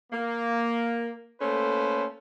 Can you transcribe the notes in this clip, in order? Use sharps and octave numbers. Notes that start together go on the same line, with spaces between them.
A#3
A3 A#3 C#4 A4 B4 C5